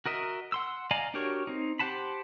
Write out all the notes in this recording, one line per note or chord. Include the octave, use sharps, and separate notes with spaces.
F#4 A#4 D#5 E5
F#5 C6 E6
D5 D#5 F5 G#5 A#5
D4 F#4 G4 A#4 C#5
C4 D#4
G4 C5 F#5 A5 B5